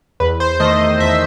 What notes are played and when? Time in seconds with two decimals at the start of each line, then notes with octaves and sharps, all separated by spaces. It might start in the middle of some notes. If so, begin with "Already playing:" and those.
0.20 E2 B4
0.40 C5
0.60 D#3 A3 D#5
0.81 D#5
1.00 E2 E5